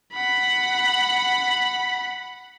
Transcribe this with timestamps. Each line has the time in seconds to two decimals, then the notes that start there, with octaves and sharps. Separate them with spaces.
0.13 F#5 B5